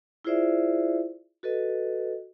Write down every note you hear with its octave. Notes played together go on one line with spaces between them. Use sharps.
E4 F4 G#4 C5 D5 E5
F#4 A4 B4 D#5